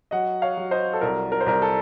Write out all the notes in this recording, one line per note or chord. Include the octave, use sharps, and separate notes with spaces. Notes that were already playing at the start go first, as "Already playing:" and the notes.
F#3 D#5 F#5
C#5 F5
F#3
C5 D#5
A4
C2 A#4
A#4
C5
C2 A#4
A4